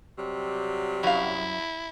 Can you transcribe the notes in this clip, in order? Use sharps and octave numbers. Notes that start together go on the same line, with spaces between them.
C3 F#3 G3
F#2 E4 F5